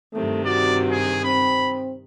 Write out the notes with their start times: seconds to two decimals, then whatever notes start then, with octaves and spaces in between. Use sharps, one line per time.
0.13 G2 C3 D#3 A3
0.45 F#4 D5
0.91 G#4
1.24 C4 B5